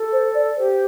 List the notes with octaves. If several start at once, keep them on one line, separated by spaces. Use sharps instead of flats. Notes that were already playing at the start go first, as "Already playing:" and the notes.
Already playing: A4
C5
D5
G4 C5